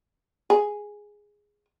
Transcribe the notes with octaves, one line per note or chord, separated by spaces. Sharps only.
G#4